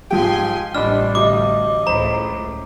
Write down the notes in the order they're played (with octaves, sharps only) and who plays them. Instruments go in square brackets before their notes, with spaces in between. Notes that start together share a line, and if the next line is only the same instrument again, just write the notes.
[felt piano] G#2 F3 G4 [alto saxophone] G5 [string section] G#5 C6
[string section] A1 C3 G3 [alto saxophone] D4 [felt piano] D#5 B5 C6 [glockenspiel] F6
[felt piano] D2 [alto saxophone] D#5 [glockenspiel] D6
[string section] C#2 A2 [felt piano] C5 B5 [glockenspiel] A#5